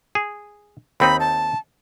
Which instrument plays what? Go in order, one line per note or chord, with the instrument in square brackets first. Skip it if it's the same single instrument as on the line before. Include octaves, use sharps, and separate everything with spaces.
[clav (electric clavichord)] G#4
[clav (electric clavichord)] D#2 C4 D#4 [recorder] B5
[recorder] A5